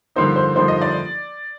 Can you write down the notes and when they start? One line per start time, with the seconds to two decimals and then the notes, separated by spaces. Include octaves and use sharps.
0.16 G2 D3 F3 A#3 D#4 C5
0.36 C5
0.55 G2 D3 F3 A#3 D#4 C5
0.68 D#5
0.81 D5